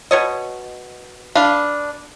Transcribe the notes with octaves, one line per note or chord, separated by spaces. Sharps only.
B2 C#5 D#5
D4 B4 F5